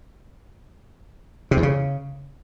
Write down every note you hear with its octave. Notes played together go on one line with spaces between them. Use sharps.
C3
E2
C#3